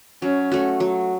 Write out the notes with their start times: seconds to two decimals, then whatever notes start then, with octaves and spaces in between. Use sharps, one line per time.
0.21 F#3 C#4
0.52 A3 F#4
0.80 F#3